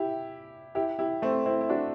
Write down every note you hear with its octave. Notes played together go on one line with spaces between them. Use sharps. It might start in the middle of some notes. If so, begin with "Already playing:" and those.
Already playing: E4 G4
E4 G4
E4 G4
A3 C4
C4 E4
E4
D4 F#4